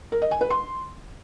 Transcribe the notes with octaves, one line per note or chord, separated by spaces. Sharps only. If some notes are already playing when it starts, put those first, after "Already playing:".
A#4
D#5
G#5
B4
C6